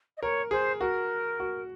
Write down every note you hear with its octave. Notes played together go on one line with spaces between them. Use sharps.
D#5
A#4 C#5
G#4 C5
F#4 A#4
F#4